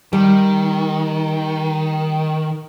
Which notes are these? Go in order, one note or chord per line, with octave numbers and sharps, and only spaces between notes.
D#3 G3